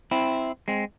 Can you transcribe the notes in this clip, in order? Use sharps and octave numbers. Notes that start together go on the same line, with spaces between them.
C4 E4
G#3 C4